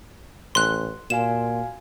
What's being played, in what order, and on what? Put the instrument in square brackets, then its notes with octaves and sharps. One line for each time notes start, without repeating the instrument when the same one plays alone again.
[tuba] A1 [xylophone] C6 F#6
[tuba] A#2 [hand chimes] F#4 F5 G#5 [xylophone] E7